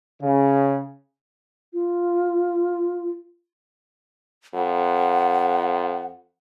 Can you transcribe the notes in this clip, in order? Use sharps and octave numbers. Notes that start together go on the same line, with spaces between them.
C#3
F4
F2 F#5